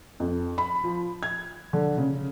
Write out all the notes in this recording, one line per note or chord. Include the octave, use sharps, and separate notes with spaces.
F2
B5
F3
G#6
D3
C#3